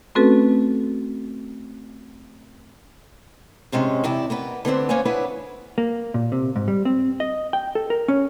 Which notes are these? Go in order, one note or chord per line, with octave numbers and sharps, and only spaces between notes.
A3 C4 C#4 F#4 A4 B4
G#2 C3 G#3 C#4
E2 C3 E4 D5
A#3 B3 B4
D3 B3 C4 D4
A#3 B3 C#4 C5 C#5 G#5
B3 D4 E4 B4 C#5
A#3
A#2
C3
G#2
G3
C4
D#5
G5
A4
A#4
C#4